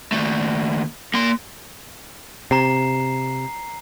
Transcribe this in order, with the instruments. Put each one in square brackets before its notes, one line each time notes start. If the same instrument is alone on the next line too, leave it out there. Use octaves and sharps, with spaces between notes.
[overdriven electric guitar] D#2 A3
A#3 C6
[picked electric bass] C3 [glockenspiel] A#5 C7